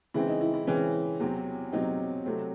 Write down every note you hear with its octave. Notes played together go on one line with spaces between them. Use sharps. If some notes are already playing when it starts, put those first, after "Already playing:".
C#3 E3 G#3 C4 E4
D#4
E4
E4
C#3 E3 G#3 C4 C#4
E2 C3 F#3 C4
E2 C3 F#3 C4 D#4
C3 F#3 A3 C4